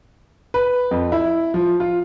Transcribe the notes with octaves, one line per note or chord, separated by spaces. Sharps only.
B4
F2
E4
F3
F4